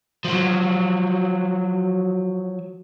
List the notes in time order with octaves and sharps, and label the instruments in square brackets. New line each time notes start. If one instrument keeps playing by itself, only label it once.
[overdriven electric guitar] F3 F#3